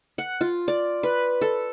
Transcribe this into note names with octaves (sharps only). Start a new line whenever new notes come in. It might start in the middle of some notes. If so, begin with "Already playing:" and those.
F#5
F4
D5
B4
A4